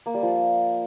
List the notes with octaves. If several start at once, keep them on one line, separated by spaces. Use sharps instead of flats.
A#3
G3
F3